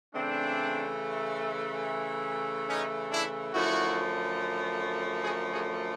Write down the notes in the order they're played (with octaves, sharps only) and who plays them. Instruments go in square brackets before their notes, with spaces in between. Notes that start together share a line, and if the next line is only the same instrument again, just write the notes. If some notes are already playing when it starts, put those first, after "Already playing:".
[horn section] C#3 E3 A3 C4 D4
C#4 D#4
D4 E4
F#2 D3 F3 A3 E4 F#4
F#4 G#4
F#4 G#4